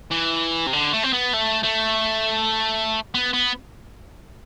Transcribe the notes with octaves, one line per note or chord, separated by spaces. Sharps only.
E3
C3
D3
A3
C4
B3
A3
A3
B3
B3